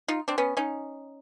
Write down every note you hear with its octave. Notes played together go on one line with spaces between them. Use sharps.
D#4 F4
C4 D4
B3 C#4
C#4 D#4